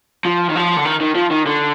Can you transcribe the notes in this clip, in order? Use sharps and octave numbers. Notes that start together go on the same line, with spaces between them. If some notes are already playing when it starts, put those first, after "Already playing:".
F3
D#3
F3
D3
D#3
D#3
F3
D#3
D3